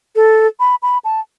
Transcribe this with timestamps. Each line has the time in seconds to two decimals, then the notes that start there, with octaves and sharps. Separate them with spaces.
0.16 A4
0.60 B5
0.83 B5
1.05 A5